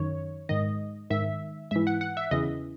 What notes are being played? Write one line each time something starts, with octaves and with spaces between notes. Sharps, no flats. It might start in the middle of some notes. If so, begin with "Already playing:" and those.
Already playing: F#2 D#3 C#5
G#2 D#3 D#5
G#2 D#3 E5
G#2 E3 E5
F#5
F#5
E5
E2 C#3 E3 D#5